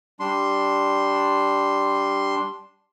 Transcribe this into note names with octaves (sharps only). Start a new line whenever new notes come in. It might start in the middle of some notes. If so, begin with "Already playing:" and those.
G3 D4 C6